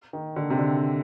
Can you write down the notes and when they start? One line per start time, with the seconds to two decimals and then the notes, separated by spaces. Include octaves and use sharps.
0.13 D#3
0.36 D3
0.50 C3
0.59 D3